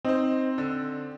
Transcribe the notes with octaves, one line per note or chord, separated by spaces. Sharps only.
C4 D#4 C5
D3